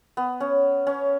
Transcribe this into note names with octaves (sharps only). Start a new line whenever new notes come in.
B3
C#4
C#4